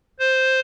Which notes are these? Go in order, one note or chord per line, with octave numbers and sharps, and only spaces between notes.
C5